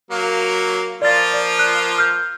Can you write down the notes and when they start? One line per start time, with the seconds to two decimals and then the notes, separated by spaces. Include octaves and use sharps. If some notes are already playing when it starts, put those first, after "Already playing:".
0.11 F#3 A#3
1.02 F3 A#3 F4 D5 A6
1.34 D5
1.59 F#6
1.98 F6 G6